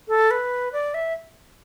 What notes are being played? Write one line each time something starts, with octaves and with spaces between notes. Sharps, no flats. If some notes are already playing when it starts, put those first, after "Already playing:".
A4
B4
D5
E5